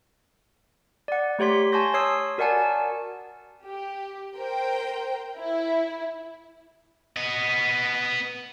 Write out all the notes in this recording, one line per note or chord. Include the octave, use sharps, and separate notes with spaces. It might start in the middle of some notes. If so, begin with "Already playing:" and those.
D5 F#5
A3 G4 C#5 C6 B6
G#5 A5 C6 C#6 G6 A#6
C#5 D#6 E6 C7
F#4 A#4 D5 F#5 G#5 A5
G4
A#4 C5 G5
E4
B3 D#5